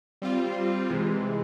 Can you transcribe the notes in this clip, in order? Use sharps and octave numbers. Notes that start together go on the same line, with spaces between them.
G3 C4 F4
C3 E3 G#3